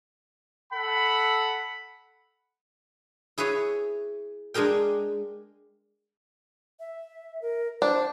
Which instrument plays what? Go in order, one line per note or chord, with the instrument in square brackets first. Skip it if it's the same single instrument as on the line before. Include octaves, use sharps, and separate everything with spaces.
[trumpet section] A4 F#5 B5
[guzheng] E4 G#4 B4 C#5
G#3 D4 G#4 A#4 G5
[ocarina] E5
A#4
[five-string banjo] D4 [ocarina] C5